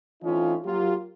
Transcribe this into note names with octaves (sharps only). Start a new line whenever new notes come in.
E3 A3 C4 C#4 D#4 F4
F#3 A#3 F4 G4